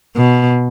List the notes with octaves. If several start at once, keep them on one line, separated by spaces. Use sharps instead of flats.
B2